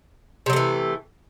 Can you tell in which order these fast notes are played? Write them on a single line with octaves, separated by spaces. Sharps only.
C3 F#3 A3 E3